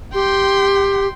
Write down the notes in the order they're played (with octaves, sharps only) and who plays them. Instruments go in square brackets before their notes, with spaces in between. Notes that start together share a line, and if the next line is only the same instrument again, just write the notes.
[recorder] G4 [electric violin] G5 C6